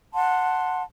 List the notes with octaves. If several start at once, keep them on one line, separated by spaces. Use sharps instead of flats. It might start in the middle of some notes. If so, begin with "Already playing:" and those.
F#5 A5 C6